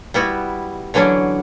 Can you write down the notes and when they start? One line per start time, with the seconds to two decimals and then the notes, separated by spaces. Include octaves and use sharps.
0.14 G3 B3 E4 F#4
0.94 D3 E3 F#3 C#4 D4